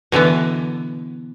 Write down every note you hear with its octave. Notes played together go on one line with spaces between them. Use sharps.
B2 D3 E3 B3